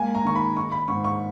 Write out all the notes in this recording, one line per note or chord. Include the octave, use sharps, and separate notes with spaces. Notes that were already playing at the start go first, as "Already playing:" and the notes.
Already playing: G#3 A#3 G#5
A#5
D#3 C#6
B5
D#4 C#6
B5
G#2 C#6
C#6